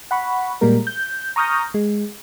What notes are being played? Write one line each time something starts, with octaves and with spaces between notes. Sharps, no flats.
F#5 B5 C#6
A#2 G3 G#3 A#3 A#4
G6
A#5 C#6 D#6 F6 G6 A#6
G#3